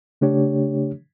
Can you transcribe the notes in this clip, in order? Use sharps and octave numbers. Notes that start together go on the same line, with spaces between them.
C#3 A3 D4 G4 C#5